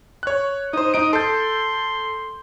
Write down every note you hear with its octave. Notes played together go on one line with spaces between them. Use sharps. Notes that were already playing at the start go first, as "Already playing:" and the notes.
C#5 F#6
D#4 C5 D#6
D#4 D#6 D7
A4 C6 G6